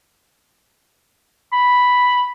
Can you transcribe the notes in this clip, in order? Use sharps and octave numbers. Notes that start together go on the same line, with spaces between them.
B5